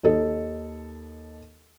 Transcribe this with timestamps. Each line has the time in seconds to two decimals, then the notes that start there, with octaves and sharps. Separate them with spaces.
0.03 D#2 D#4 A4 D#5